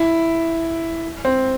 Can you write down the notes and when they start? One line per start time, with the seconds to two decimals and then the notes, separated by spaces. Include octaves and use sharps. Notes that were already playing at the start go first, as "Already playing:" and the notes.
Already playing: E4
1.25 C4